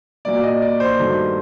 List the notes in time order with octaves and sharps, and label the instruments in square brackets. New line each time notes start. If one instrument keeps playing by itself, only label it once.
[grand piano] A#2 F#3 A#3 D5
D#5
D5
C5
G2 D#3 F#3 A3